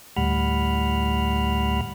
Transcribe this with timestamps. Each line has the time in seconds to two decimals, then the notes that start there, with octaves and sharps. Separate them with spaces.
0.16 D2 A2 G3 F#5 B5 F6